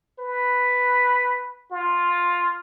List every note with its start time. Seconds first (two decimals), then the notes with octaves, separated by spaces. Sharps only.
0.19 B4
1.71 F4